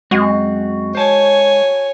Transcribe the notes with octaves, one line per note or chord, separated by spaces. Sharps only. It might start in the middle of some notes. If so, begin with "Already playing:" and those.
F#2 G#3 C4 F#4
C5 C#5 G#5 A5